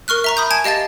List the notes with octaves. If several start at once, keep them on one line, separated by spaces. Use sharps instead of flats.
A#4 C#6 F6 F#6
E5 A#5 C#6
B5 D#6 G6
G#5 A5 G#6 D7 D#7
G4 D#5 F5 A5 A6